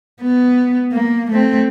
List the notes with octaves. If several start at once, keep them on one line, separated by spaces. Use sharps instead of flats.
B3
A#3
A3 C4